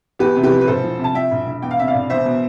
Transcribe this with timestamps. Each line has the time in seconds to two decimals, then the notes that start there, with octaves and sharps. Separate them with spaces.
0.19 E2 G4 B4
0.36 C3
0.43 G4 B4
0.52 F3
0.61 B4
0.67 E1 A4 C5
0.84 F3
0.99 C3
1.04 A5
1.14 F3 E5 G5
1.31 E1
1.47 E1
1.62 E2 G5
1.71 F5
1.79 C3 E5
1.88 D5 F5
1.94 E1
2.10 E2 C5 E5
2.25 B2